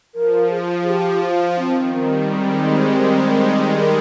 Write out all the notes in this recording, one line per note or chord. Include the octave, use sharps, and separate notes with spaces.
F3 A#4
G#4
G4
F4
D#3 C4
G3 C4
G#3 C4
A#4